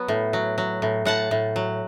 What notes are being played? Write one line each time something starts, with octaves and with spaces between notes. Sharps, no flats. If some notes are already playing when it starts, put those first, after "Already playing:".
Already playing: F#3 B3
A2
F#3
F#3
A2
A2 F#5 A5
A2
F#3